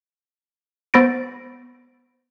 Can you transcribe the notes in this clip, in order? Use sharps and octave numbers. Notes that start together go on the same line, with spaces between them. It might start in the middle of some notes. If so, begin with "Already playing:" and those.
B3 C5 B5 A6 A#6 D7